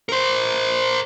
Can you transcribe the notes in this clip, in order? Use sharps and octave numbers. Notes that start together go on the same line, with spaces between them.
A#4 C5